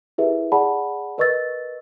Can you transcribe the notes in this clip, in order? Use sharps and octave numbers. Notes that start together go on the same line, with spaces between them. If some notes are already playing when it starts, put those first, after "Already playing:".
E4 G4 G#4 A#4 B4 E5
G#4 D5 F#5 A5 B5
A#4 B4 D#5 C#6 E6 A6